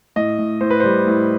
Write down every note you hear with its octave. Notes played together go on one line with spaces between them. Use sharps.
A2 D#5
A2
A2 C5
B4
G3 C5
A2